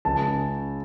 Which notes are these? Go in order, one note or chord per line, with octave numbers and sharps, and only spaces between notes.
C#2 A5
C#3